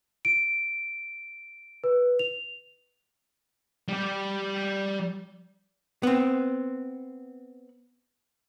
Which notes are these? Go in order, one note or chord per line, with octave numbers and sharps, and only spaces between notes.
D7
B4
F7
G3 G4
B3 C4